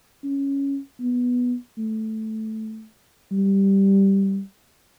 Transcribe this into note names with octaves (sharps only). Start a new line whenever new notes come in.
C#4
B3
A3
G3